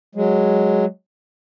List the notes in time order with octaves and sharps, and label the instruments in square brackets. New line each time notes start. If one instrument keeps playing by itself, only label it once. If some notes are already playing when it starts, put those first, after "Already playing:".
[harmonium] F#3 G#3